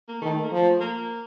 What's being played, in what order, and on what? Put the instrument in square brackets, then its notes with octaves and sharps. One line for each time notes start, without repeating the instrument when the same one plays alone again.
[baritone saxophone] A#3
[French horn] D#3 [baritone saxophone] A3
[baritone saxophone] A#3
[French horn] F3 [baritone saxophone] A3
[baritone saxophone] A#3